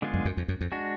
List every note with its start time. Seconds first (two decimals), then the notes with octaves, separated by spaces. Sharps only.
0.02 D3 G#3 B3 F4 G#4
0.14 F#2
0.25 F#2
0.37 F2
0.48 F#2
0.61 F2
0.72 G#3 D4 F#4